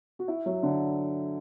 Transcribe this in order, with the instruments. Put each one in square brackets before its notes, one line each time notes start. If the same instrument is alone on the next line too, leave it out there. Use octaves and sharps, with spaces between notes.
[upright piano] F#4
E4
F#3
D3